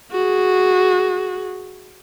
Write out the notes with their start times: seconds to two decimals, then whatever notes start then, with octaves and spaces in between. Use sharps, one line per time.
0.12 F#4 G#4